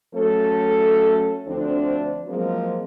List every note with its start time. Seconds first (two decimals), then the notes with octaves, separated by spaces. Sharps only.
0.15 F#3 A3 C#4 A4
1.47 D2 D3 F3 C4 D4
2.28 F3 F#3 G#3 A#3 C4